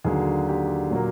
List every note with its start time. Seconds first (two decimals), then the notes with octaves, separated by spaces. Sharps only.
0.04 D#2 D3 F#3 G#4
0.48 G4
0.90 A#2 F#3 A#3